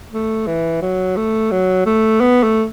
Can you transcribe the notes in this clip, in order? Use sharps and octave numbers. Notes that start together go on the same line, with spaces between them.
A3
E3
F#3
A3
F#3
A3
B3
A3